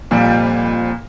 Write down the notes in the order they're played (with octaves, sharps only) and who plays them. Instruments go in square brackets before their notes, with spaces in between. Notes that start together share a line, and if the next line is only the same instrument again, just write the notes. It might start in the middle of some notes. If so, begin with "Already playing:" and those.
[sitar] F2 G3 [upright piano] A#2